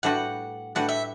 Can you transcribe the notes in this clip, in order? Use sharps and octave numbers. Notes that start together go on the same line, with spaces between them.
A2 G3 D4 F#4 B4 F#5
A2 G3 D4 F#4 B4 F#5
E5